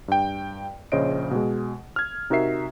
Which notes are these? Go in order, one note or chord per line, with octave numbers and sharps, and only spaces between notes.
G2 G5
A#1 C#3 C5 C#5 D#5 D7
B2 G#3
F6 G#6
C3 D#4 F#4 A#4 E5 C7